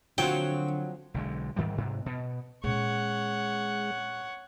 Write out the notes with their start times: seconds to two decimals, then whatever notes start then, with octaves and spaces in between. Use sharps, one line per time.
0.18 D3 F3 F#3 C4 G5
1.14 B1 D3 G#3
1.56 G#2 D#3 E3 G3
1.78 G#2 C3
2.06 B2
2.64 A#2 G#3 C#4 C#5 F#5